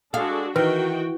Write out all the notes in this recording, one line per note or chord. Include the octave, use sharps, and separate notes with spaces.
G#3 D4 F#4 G#4 A4 F5
D#3 E3 F#4 B4 G5